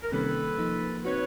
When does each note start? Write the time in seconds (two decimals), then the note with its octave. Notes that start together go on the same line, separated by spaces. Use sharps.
0.02 A#4
0.12 C3 D#3 G3 A#3 C#4 A4 B4
0.58 F3 A#3 D#4
1.04 C4 D#4 F#4 B4 C#5